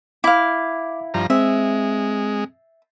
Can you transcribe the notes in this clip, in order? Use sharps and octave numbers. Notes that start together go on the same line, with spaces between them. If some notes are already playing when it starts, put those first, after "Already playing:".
E4 F5 D6
G2 F3 A#5
G#3 C4 E5